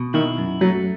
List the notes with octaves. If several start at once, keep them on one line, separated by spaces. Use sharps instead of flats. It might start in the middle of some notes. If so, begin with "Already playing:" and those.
Already playing: B2
D#3 E4
F#2
F#3 A3